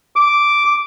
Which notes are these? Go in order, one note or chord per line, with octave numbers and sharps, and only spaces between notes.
D6